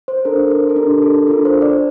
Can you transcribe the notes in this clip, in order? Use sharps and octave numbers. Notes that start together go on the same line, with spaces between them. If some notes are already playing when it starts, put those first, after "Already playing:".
C5
D4 A4 A#4
A#4
A4
D4 G4 A#4
A#4
A4
A4
D4 F4 A4 A#4
C5
D5